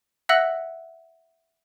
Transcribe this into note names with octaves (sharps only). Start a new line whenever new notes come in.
E5 F#5 E6 F#6 A#6 F#7